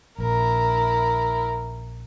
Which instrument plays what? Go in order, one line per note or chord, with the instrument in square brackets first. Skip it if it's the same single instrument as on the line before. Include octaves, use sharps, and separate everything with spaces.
[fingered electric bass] A#1 [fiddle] E4 A#4